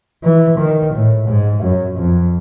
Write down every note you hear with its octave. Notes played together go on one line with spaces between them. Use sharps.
E3
D#3
A2
G#2
F#2
F2